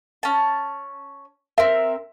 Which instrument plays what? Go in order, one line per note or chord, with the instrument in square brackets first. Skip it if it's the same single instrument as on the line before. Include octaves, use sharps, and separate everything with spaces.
[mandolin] C#4 A5
[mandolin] C4 A#4 [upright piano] E5